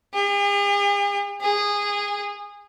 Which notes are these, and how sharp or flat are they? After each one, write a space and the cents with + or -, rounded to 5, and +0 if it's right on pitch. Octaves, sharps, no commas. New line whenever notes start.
G#4 -45
G#4 -20